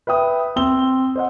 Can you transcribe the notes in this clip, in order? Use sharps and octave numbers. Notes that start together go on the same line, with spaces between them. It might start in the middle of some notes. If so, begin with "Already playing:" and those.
B4 E5 G5 D#6
C4 E6 G7
C5 D#5 F#5